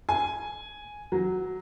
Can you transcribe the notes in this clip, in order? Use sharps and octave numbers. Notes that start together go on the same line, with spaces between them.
G#5
F#3